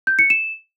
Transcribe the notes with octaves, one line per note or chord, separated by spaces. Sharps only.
G6
C#7
E7